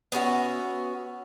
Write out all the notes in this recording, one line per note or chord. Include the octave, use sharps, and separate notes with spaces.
B3 C#4 F#4 E5